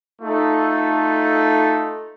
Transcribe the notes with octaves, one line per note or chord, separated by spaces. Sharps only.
A3 D#4 F4 A4